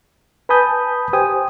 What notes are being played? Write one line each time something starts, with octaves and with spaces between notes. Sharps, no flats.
B4 G#5 A5 B5 D#6 G6
G4 C5 G5 G#5 D#6